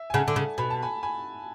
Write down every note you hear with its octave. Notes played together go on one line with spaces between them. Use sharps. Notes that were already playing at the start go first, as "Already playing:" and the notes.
Already playing: E5
G#5
C#3 F#5 A5
D3
C#3
B2 B5
A5
G#5 B5
G#5 B5